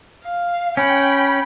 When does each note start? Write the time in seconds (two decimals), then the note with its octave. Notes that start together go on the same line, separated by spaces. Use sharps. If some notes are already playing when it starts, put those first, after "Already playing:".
0.23 F5
0.77 C#4 G5 B5